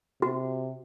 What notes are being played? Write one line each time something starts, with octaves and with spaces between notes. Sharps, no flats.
C3 F#4